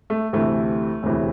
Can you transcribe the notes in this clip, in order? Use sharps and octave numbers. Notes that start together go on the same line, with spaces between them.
A3
D2 C3 E3 A3
E1 D2 C3 E3